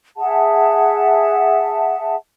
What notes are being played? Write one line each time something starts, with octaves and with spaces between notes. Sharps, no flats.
G#4 E5 F#5 A5